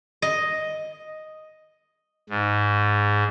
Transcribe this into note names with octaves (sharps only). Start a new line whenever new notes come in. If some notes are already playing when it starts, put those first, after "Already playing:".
D#5
G#2